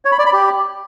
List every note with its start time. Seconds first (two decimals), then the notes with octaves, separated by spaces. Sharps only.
0.05 C#5
0.12 B5
0.19 D5
0.26 B5
0.33 G4